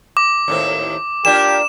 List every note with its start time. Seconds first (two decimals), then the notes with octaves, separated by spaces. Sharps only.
0.17 D6
0.48 D#2 A2 C4
1.25 A#3 D4 F4 G4 E7